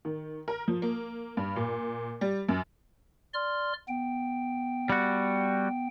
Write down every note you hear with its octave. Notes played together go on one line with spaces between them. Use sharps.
D#3
A#4
F3
A#3
G2
A#2
G3
F#2
D5 C6 F6
B3 G5
G3 F#4